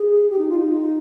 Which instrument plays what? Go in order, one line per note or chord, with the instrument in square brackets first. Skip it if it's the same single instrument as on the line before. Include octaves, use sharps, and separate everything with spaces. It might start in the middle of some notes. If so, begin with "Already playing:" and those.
Already playing: [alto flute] G#4
G4
D#4
F4
D#4